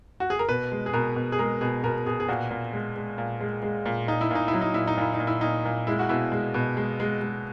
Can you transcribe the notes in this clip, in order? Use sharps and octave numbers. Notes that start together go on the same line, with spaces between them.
F#4
G#4
A#4
B2 B4
G#3
G#4
B2 A#4
B2
G#4
G#3 A#4
B2 G#4
B2 A#4
B2 G#4
G#4
A#2 F#4
A#2
G#3
G#3
A#2
G#3
G#3
A#2
A#2 D#4
E4
A#2 D#4
E4
F#3
D#4
A#2 E4
D#4
A#2 E4
D#4
A#2
E4
A#2 D#4
A#2
G#3 E4
F#4
B2 E4
G#3
B2
G#3
G#3
G#3